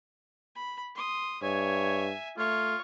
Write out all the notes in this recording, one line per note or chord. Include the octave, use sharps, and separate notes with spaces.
B5
C6 D#6
G2 C#5 E5 G#5
A3 F4 C#5 C#6